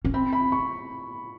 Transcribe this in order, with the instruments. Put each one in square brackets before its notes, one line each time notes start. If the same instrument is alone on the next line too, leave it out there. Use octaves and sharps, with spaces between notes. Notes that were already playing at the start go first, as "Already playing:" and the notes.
[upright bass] C#4
[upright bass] C4 [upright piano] B5
[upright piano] B5
C#6